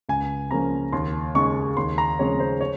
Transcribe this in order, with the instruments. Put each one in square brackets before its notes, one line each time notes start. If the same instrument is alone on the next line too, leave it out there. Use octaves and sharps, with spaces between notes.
[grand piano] C#2 G#5
C#3 F3 A#3 C#4 A#5
D#2 C6
C#3 G#3 D#4 C#6
D#2 C6
A#5
C#3 F3 G#3 C4 C#5
C5
C#5